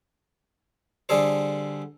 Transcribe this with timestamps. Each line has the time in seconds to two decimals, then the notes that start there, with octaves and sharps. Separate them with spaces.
1.09 D3 G3 G#4 A4 C5